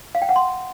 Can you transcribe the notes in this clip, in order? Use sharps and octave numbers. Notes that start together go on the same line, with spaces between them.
F5
G5
F#5
C6